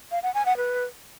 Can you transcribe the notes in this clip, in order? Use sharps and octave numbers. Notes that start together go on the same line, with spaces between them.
F5
F#5
G#5
F#5
B4